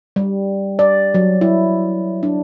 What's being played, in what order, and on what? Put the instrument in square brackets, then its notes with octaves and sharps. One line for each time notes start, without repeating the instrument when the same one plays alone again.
[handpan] G3
D5
F#3
E4
D4